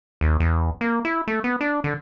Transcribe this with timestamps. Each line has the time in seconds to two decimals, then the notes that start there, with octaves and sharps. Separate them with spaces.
0.21 D#2
0.40 E2
0.81 A#3
1.05 E4
1.28 A3
1.44 B3
1.61 D4
1.84 D3